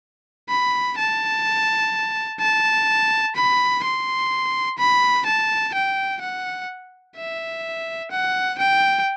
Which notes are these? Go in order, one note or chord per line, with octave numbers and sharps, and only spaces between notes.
B5
A5
A5
B5
C6
B5
A5
G5
F#5
E5
F#5
G5